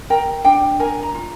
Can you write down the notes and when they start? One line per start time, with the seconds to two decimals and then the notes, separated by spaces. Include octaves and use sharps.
0.10 A#4 G5
0.45 D4 G5
0.80 A#4 G#5
1.03 A#5
1.14 F4